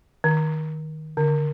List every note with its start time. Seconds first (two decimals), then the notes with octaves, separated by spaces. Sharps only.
0.24 D#3
1.17 D3